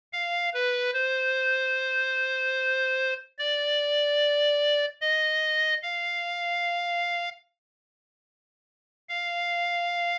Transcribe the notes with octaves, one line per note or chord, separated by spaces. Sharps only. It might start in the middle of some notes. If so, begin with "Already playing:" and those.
F5
B4
C5
D5
D#5
F5
F5